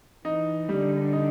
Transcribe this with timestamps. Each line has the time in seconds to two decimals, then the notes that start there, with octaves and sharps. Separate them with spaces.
0.24 E3 D#4
0.68 D3 G3
1.13 D#4